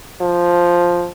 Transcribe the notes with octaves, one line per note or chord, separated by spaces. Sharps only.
F3